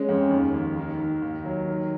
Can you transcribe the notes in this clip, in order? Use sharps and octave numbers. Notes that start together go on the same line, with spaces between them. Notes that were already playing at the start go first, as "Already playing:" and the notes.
Already playing: G#3 C#4
F2
D#2
D#2
D#3
D#3
D#2
F#3
D#3